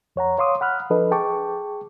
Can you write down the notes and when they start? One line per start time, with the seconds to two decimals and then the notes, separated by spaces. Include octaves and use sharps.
0.16 F2 C#5 F#5 A#5
0.38 C#5 F5 C6 D6 D#6
0.61 F#5 B5 F6 F#6
0.90 F3 D4 A4 B4 D#5
1.11 G#4 G5 A5 C#6 D6